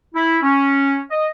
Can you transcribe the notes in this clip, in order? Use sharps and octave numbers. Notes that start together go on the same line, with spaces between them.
E4
C#4
D#5